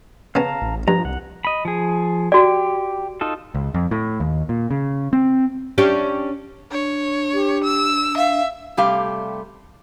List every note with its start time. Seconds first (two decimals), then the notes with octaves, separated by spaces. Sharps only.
0.35 C#3 B3 C#4 F5 A5 A#5
0.62 A1
0.88 G2 F3 A#5
1.05 C2 F#5
1.45 D#5 B5
1.65 F3 G#4
2.32 F#4 G4 D5
3.21 D#4 F4 A4
3.55 C#2
3.74 F2
3.91 A2
4.20 D#2
4.49 A#2
4.71 C#3
5.13 C4
5.78 C#4 D4 G4
6.71 D4 C#5
7.33 G4
7.64 E6
8.17 E5 F5
8.77 C3 G3 A3 G4 F5